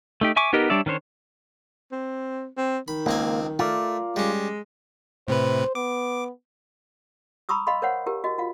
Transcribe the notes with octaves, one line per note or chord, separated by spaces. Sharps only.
A3 D#4 G4
E5 G#5 C#6 D6
B3 D#4 G4 A#4 D#5
G3 D4 C#5 D5 E5
D#3 C#4 D4 C5 C#5
C4
C4
D#3 B5
C#2 A#3 C4 G#5
A3 F4 A#4 D5
G3 G#3 C#4
A2 C3 B4 C5
B3 D6
A#5 B5 C#6 D#6 E6
D#5 F5 B5 C6
A#4 C5 C#5 F5 F#5
E4 G4 A#4
F#4 D#5
F4 F5